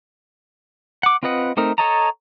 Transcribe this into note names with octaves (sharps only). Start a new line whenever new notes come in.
F#5 D6
C4 F4 B4 D#5 F#5
A3 C4 D#4 A#4
A4 C#5 D#5 A5 A#5